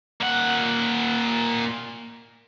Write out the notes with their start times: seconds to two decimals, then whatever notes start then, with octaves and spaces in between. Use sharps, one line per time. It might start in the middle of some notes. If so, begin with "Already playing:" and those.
0.21 A#2 F#5